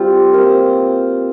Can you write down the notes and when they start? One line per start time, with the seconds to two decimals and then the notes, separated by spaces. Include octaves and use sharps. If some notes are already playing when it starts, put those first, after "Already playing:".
Already playing: G3 C4 F4
0.33 A#3 F4 C5